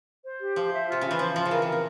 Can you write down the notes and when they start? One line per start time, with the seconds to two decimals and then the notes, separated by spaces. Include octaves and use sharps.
0.25 C5
0.41 G4
0.56 F3 C5
0.73 E5
0.88 C3 F4
1.01 C#3 F4
1.11 E3
1.19 F3 C5
1.35 F3 F4
1.46 C#3
1.51 E3 A#4
1.62 C3 A#4
1.72 A#2